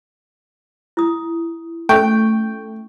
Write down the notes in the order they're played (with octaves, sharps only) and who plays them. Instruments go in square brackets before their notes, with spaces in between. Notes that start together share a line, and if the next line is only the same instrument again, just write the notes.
[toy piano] E4 D#6
[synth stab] A3 [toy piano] C#4 C#6 [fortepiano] G5